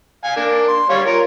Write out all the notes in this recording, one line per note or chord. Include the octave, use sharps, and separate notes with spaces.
F5 G#5
A#3 D4
C6
G3 C#5 F5
F4 A#4